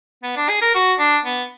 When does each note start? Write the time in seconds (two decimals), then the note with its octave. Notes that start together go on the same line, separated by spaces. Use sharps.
0.23 B3
0.37 D4
0.49 G#4
0.62 A#4
0.75 F#4
0.99 D4
1.25 B3